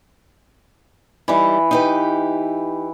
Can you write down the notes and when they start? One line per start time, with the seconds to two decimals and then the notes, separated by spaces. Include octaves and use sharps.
1.28 E3 G3 D#4
1.71 D#4 G4 B4